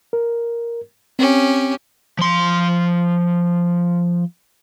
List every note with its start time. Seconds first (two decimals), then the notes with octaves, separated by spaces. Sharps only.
0.13 A#4
1.19 C4 C#4 G4
2.19 F3 C6